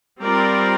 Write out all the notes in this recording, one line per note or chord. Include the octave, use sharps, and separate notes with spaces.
G3 C4 F4 A#4 D5